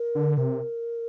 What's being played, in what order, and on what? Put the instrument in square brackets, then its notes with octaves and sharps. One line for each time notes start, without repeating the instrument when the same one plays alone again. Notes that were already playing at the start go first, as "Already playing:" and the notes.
Already playing: [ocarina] A#4
[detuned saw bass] D3
[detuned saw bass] C3 [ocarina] A#4